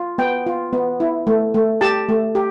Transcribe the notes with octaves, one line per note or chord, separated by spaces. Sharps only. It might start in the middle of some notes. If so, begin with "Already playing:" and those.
Already playing: F4
B3 G5
F4
B3
E4
A3
A3
G4 A5
A3
G4